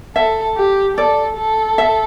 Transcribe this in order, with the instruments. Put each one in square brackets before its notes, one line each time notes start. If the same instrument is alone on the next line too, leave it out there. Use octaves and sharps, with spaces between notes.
[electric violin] A4 [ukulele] E5
[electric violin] G4
[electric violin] A4 [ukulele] D5
[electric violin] A4
[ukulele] E5